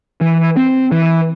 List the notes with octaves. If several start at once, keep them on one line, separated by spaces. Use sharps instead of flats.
E3
C4
E3